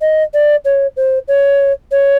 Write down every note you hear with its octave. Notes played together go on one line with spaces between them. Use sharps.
D#5
D5
C#5
C5
C#5
C#5